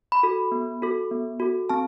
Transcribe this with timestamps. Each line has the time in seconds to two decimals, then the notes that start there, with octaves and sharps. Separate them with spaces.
0.12 B5
0.23 F#4 A4
0.52 B3
0.82 F#4 A4
1.11 B3
1.40 F#4 A4
1.69 C4 A5